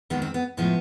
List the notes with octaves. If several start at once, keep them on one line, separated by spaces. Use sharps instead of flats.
D#2 D#3 G#3 B3
C4
B3
A2 F3 G#3 B3